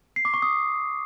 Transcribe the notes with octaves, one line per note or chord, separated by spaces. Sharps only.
C7
D6
C#6
D#6